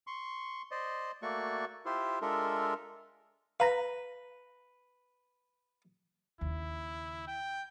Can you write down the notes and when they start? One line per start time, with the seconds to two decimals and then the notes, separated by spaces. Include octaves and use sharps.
0.07 C6 C#6
0.71 C5 D5 D#5
1.22 A3 A#3 F#4 D5 C#6
1.86 E4 F4 G4 C5
2.22 G#3 D4 F4 A4 A#4 E5
3.60 B4 F5 A#5 A#6
6.41 D#2 C#3 E4
7.27 G5